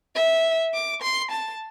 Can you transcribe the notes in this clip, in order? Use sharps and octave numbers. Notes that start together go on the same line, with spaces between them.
E5
D6
C6
A5